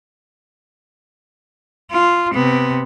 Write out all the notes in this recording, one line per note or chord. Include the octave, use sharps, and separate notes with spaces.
F4
C3 B3